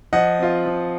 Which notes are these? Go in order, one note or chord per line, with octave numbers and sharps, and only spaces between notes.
F3 D#5 F#5
C4 F4
F3